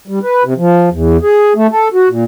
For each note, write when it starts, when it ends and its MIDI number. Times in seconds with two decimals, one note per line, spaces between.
0.08 0.19 55
0.23 0.43 71
0.44 0.54 48
0.58 0.89 53
0.92 1.17 40
1.22 1.53 68
1.56 1.67 57
1.71 1.88 69
1.94 2.08 66
2.10 2.24 46